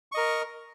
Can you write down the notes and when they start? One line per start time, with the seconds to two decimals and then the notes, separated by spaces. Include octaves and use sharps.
0.12 C#6
0.15 D#5
0.17 A#4